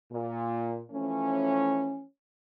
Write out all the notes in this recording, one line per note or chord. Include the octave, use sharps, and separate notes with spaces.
A#2
E3 F3 A3 C#4